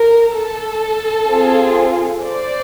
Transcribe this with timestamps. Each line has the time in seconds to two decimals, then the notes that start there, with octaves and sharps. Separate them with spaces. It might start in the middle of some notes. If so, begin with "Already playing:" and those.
Already playing: A#4
0.35 A4
1.29 C4 F4 G#4
2.23 C5 D5